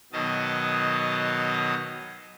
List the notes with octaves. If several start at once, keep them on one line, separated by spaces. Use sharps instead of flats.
B2 D#3 F#3 D#5 A5